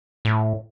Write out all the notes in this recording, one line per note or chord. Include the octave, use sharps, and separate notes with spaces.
A2